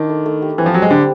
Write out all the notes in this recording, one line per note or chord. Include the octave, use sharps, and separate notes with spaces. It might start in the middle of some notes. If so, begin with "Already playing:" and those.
Already playing: D#3 D4 E4
A3
A3
G4
E3 C4
F3
F#3 G3
G#3
D3 G3